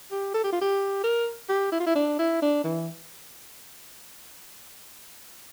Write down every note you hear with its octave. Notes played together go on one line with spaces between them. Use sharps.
G4
A4
G4
F4
G4
A#4
G4
E4
F4
E4
D4
E4
D4
E3